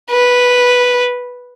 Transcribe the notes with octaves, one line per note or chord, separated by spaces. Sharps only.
B4